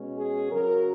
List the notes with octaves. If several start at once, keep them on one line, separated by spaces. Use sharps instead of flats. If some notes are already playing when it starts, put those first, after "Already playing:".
Already playing: B2 G#3 C#4
G#4
F#2 C#3 F#3 A#4